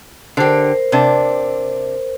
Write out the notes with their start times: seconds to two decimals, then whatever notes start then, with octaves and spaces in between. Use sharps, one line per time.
0.37 D3 G4 A#4 C5
0.92 C3 D4